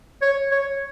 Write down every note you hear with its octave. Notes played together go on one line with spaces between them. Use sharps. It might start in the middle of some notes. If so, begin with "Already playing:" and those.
C#5
C#5